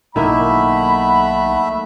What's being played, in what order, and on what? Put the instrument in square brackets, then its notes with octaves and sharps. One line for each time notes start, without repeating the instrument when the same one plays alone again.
[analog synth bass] B1 [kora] D#3 A#3 E4 [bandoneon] A3 E5 [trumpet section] F#5 B5